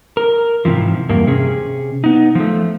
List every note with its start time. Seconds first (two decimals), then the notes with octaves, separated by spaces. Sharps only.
0.17 A#4
0.65 G#2 C3 E3 F3
1.10 E2 G2 A#3
1.27 C3 C#4 G#4
2.04 B3 D#4
2.35 F3 A3